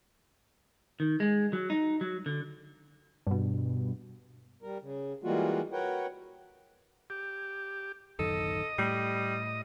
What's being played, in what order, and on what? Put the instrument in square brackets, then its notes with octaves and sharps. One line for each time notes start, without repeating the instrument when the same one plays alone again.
[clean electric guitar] D#3
G#3
F#3
D#4
F#3
D3
[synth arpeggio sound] G2 B2
[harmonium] G3 A#4
C#3
E3 G3 G#3 A#3 F4 F#4
F#4 A#4 B4 C#5 F#5 G5
[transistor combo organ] G4
[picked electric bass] D1 F#2 D#3 [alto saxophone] A4 [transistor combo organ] D#5
[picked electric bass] A2 [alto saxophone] G3